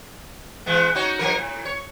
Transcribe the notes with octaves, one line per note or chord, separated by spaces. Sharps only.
E3 G#3 B3
D#4 F#4 C#5
G2 F3 A#4
A2
C#5